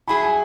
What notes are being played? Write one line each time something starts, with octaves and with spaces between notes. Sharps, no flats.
F#3 E4 G#4 B5
G#5